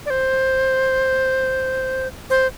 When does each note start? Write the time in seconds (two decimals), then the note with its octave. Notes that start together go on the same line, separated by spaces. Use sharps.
0.06 D5
0.10 C5
2.30 C5